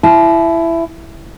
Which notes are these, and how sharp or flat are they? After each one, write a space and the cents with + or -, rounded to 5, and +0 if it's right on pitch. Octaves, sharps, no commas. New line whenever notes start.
E4 +15 A5 -35